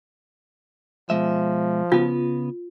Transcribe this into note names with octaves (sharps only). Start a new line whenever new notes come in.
B2 F3 G#3 E5
C#3 B3 F4